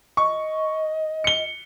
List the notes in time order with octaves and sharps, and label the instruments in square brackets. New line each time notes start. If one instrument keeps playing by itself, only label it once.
[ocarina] D#5 [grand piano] C#6
[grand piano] C#7 G7